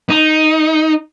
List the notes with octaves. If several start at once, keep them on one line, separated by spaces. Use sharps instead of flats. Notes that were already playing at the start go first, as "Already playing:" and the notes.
D#4